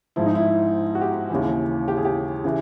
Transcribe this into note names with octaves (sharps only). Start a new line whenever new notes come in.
G#2 F3 E4
D#4
E4
F#4
G4
D#2 C#3 E3
G4
G#4
G4
C#3 E3 G4